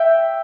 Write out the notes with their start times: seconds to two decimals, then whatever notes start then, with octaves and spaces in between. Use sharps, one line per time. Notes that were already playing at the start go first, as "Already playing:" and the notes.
Already playing: E5 G5